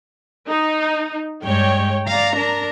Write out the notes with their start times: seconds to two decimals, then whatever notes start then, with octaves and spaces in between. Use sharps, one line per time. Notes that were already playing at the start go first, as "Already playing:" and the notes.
0.48 D#4
1.44 G2 G#3 C#5 G5
2.08 D5 F5 A#5
2.37 D4 A#4